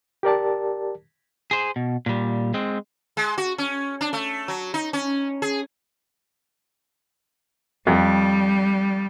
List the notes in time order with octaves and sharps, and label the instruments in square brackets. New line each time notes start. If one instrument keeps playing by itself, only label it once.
[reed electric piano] G4 A#4 D5 A5
[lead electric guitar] G#4 C5
B2
A#2 G3
G#3 C4
[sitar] G#3
F#4
C#4
D4
A3
F#3
D#4
C#4
G#4
[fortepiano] F2 [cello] G3